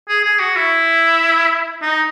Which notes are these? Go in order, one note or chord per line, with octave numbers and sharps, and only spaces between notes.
G#4
G#4
F#4
E4
D#4